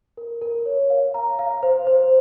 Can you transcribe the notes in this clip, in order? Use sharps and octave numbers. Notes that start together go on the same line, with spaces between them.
A#4
A#4
C#5
F5
A#5
F5
C5
C5